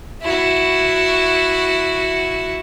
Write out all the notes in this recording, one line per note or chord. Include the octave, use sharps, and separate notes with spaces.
E4 F#4